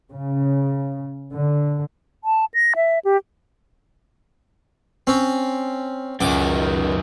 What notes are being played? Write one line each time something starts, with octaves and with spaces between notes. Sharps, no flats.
C#3
D3
A5
A#6
E5
G4
C4 C#4
C#2 F#2 D#3 D6